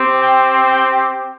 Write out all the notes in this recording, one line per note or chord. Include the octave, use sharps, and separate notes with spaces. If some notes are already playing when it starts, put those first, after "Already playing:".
Already playing: C4 G4
G5
G5